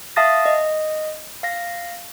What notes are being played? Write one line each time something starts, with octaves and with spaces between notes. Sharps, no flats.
E5 F5 A5 D#6 A6 A#6
D#5
F5 A#6